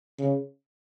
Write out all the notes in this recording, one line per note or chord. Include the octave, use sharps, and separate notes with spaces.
C#3